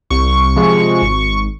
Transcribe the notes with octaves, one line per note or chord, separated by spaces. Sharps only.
C2 C#6
C3 F3 G#3
G#1